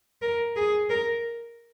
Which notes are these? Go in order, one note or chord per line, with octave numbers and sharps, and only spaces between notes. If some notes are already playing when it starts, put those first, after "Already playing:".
A#4
G#4
A#4